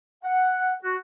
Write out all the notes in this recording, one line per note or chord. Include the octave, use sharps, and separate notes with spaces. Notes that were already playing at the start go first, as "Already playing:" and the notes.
F#5
F#4